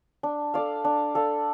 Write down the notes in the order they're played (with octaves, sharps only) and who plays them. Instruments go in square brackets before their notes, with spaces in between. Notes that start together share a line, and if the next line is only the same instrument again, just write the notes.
[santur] D4
A4 D5 F5
D4
A4 D5 F5